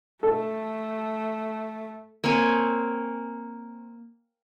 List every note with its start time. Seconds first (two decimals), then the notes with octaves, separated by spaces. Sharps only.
0.23 A3 A4
2.24 A#3 C4 C#5 G#5